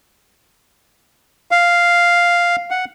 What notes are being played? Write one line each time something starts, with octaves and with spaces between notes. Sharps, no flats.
F5
F#5